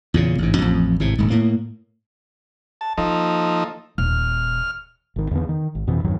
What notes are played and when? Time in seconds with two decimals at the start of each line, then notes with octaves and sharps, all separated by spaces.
0.14 E2 A#2 C#3
0.38 A1 G#2
0.58 A1 F2
1.00 G#1 A2 C3
1.18 D#1 G#2
1.30 A2 A#3
2.81 A5
2.98 F3 A#3 D#4 A4
3.98 D#1 F6
5.16 G#1 D#3
5.31 E2 D3 B3
5.49 D#3
5.75 G#1
5.87 F2 B2 E3
6.04 E2 G2 D#3 F#3